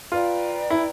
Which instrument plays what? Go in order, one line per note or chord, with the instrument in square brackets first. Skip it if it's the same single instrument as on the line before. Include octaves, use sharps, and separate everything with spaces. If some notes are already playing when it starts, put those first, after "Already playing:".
[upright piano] F4 [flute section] B4 D5 G5 A#5
[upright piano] E4